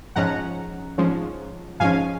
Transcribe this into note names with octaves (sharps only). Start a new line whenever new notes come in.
G#2 F3 G#3 C#4 F#5 A#5
G#2 F3 G#3 C#4
G#2 F3 G#3 C#4 F5 G#5